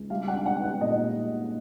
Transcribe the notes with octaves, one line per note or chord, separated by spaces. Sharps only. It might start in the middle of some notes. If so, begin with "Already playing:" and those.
Already playing: C#2
G3 F5
F#5
D4
F#5
B3
F#5
A#2 D#5